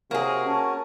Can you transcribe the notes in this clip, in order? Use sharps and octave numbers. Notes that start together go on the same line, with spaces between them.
C3 A#3 F#4 G#4 A#4 C#5
C#4 A5